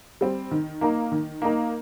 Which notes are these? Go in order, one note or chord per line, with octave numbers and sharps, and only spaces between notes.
G3 C4
D#3
A#3 D#4 A#4
D#3
A#3 D#4 A#4